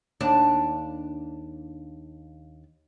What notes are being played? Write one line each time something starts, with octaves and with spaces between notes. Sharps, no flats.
D#2 D4